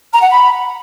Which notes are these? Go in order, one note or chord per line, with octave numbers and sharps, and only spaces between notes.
A#5
F#5
B5